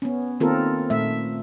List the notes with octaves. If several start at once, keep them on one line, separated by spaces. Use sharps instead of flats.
B3 C#4
D#3 A#3 C4 F4 A4 A#4
A#2 A3 E5